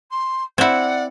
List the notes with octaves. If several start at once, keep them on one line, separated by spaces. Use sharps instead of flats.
C6
C4 E4 D5 F#5